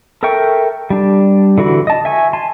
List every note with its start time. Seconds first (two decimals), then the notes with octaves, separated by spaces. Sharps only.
0.23 A4 A#4 E5 G5 C#6
0.90 G3 D4
1.58 D3 E3 F#4 B5
1.87 D#5 A5
2.05 E5 G#5 C#6
2.33 G#5 A5 C6